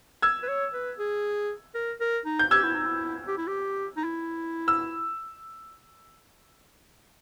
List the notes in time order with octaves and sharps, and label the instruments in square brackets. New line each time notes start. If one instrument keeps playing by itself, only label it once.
[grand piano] E6 G#6
[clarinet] B4
C#5
B4
G#4
A#4
A#4
D#4
[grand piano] G6
[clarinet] G4 [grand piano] E6 G#6
[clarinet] E4
D#4
E4
G4
E4
G4
D#4
E4
[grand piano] E6